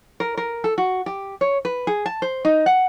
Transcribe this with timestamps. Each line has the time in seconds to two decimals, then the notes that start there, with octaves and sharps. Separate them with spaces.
0.20 A#4
0.37 A#4
0.64 A4
0.78 F#4
1.06 G4
1.41 C#5
1.65 B4
1.87 G#4
2.06 A5
2.22 C5
2.45 D#4
2.66 F#5